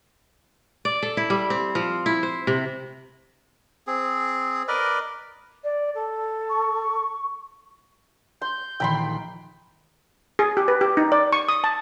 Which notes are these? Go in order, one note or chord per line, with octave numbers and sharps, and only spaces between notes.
D5
A4
E4
G3
C4
F3
E4
C5
C3
C4 G#4
A#4 B4 D5 D#5
D5
A4
C#6
C6 G6
A#1 D#3 E3 G5 B5 C6
G#4
G4
B4
G4
D#4
D5
C#6
D#6
A5